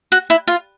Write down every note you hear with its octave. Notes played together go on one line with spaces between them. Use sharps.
F#4
E4
F4